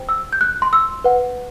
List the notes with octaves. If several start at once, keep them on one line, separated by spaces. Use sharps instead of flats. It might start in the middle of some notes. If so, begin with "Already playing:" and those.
Already playing: C5 G5
E6
G6
F#6
C6
E6
B4 F#5